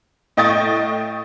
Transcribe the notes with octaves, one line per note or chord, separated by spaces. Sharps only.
A2 D#5 G5 C#6 D#6 A6